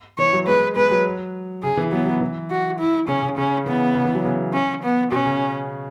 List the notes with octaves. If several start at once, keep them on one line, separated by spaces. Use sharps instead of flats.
E3 C#5
F#3
G#3 B4
G#3 B4
F#3
C#3 G#4
E3
F#3 B3
F#3
E3
F#4
E4
C#3 C#4
C#3
C#3 C#4
E3 B3
C#3
E3
F#3
C#3
C#4
B3
B2 C#4
C#3